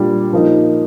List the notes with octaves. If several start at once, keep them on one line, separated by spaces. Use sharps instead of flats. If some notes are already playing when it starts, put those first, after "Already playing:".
Already playing: A#2 G3 D4
F3 A#3 D#4